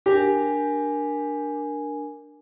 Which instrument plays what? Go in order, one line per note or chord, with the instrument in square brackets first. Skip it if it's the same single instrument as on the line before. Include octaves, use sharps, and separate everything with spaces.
[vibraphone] D4 A#4 G#5 [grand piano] G4